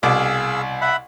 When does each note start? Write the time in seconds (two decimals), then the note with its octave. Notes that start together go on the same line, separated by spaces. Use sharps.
0.03 C2 B2 G#4 F5 D6 E6
0.81 E5 F#5 B5